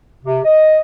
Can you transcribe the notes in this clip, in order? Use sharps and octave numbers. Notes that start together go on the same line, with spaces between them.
C3
D#5